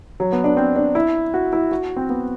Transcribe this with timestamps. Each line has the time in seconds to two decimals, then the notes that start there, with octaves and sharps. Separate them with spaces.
0.20 F#3
0.32 B3
0.44 D4
0.57 C4
0.76 D4
0.95 E4
1.34 F#4
1.53 E4
1.72 F#4
1.96 C4
2.09 B3